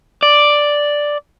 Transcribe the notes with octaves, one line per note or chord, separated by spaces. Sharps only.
D5